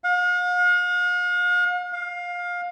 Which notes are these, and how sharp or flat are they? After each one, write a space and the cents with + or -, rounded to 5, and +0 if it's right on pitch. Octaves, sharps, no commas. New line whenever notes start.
F5 +45
F5 +20